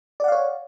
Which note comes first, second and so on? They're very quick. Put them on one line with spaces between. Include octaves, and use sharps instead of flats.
D5 F#5 F5 C#5